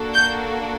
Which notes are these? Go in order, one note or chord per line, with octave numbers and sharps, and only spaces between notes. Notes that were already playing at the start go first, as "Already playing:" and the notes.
Already playing: A#3 D4 F#4 A4
G6